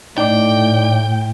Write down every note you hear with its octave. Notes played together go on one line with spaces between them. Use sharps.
A2 D#4 D5 G5 D6